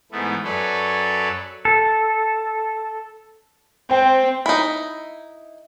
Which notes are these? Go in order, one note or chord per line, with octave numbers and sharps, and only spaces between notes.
G#2 E3 A3 B3
F#2 A4 B4 C#5 D5
A4
C4 C5 G5
D#4 E4